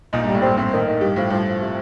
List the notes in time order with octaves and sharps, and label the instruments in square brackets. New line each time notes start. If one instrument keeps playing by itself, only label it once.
[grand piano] A#1 A#2 [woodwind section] D#4
[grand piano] G2 [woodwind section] G3
[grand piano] A2
[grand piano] G2 [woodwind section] C4
[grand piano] A2 [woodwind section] C4
[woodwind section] D#3
D#3
[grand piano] G2 [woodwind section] G4
[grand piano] A2 [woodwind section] F3
[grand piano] G2 [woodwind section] F3
[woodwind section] F3
C3